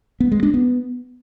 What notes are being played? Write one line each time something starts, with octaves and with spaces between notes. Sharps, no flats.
B3
G#3
D4
B3